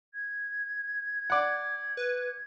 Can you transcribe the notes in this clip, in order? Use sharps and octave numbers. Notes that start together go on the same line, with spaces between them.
G#6
D5 F#5
B4